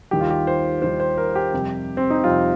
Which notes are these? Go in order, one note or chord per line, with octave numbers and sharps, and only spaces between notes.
D#2 D#3 G3 G4
F4
G4
C5
D#2 D#3 G3 C5
C5
A#4
G4
F2 C3 G3
C4
D#4
F2 C3 G3 F4